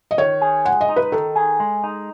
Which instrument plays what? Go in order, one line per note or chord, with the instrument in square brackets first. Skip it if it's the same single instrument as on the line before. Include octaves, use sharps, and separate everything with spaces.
[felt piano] D#5
[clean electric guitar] D#3 [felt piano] C#5
[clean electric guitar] G#4
[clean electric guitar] G#3 [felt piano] F#5
[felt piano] D#5
[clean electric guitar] D#4
[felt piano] B4
[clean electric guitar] D#3 [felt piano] A4
[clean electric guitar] G#4
G#3
D#4